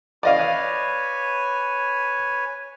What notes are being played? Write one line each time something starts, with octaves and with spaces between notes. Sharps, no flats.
E4 F#4 D5 D#5 F5 G#5
B4 C#5 G#5